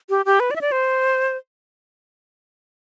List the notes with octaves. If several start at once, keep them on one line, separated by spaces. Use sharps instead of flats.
G4
G4
B4
D5
E5
D5
C5